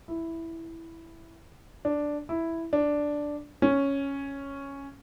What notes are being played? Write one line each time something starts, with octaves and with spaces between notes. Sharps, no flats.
E4
D4
E4
D4
C#4